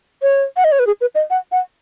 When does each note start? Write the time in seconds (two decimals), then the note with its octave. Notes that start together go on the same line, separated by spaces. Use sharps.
0.22 C#5
0.57 F#5
0.64 D#5
0.72 C#5
0.79 B4
0.87 G#4
1.01 B4
1.15 D#5
1.30 F#5
1.52 F#5